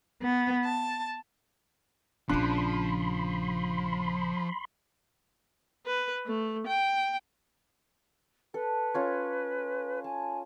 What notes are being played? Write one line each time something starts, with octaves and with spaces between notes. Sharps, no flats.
B3
A5
A#1 C#3 F3 D4 B5 C6
B4
A3
G5
A4 B4
C#4 F4 C#5
G#5 A5